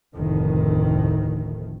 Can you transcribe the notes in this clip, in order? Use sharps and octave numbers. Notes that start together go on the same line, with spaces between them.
F1 D2 A2 D#3